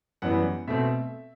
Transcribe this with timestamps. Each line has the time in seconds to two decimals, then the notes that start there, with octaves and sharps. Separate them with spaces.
0.22 F#2 E3 G3 B3 F#5
0.68 B2 A3 C4 E5